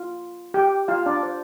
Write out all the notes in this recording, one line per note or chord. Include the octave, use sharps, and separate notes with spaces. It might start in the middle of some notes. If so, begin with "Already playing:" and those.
Already playing: F4
G4 G5
F4 F5
D4 D5
C5